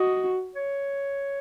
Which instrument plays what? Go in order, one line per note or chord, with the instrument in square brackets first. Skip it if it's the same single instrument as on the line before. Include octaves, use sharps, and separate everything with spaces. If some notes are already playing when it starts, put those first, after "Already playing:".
Already playing: [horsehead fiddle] F#4 [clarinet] D#5
[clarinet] C#5